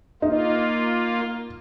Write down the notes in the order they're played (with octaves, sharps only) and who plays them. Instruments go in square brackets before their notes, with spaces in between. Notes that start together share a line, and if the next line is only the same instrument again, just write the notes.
[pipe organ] A#3 F4 [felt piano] D#4